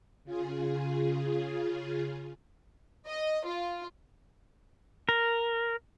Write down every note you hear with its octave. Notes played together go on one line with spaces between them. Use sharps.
C#3 F4 G#4
D#5
F4
A#4